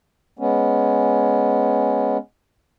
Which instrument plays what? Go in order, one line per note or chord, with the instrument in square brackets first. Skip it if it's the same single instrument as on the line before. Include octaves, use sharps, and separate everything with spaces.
[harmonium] G#3 B3 C#4